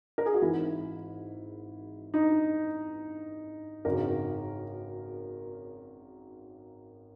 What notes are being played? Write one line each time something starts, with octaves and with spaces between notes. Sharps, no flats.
A#4
G#4
F#4
G#1 G#2 E3 E4
D#4
G#1 F#2 C#3 A#4